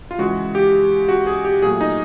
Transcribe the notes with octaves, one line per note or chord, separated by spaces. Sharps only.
F4
C#3 E3 G#3 F#4
G4
F#4
G#4
G4
A#2 F#3 A3 G#4
D#4